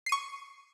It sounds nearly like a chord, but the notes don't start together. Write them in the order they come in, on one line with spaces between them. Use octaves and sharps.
C7 D#7 C#6